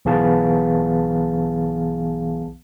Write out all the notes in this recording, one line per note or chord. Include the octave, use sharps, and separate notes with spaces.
B1 E3 B3 G#4 F5 A5